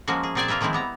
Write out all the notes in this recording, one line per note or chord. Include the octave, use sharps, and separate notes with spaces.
F3 G#3 A#3 C#4 F#4
G#4
A#2 C4 G#4 D5 G#5 A5
A#3 F4 A#4 B4 E5
D#3 F3 G#3 C4 E4
G3 B3 A#5